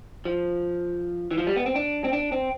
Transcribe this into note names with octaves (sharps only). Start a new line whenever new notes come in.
F3
E3
F3
G3
B3
C4
D4
C4
D4
C4